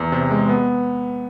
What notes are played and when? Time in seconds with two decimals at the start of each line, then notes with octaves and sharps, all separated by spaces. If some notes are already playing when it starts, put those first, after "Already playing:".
Already playing: E2
0.12 C3
0.30 G#3
0.49 B3